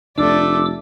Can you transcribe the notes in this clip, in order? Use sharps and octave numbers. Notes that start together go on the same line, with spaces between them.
F1 A3 D4 D5 D6 E6